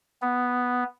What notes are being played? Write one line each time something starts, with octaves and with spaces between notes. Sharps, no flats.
B3